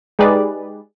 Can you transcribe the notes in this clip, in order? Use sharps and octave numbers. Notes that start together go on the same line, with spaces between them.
G#3 D#4 G4 G#4 B4 D5